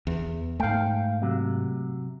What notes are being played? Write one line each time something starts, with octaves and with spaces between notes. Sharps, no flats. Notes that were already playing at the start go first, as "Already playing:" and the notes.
E2
G#2 A3 F5 G5
C3 F#3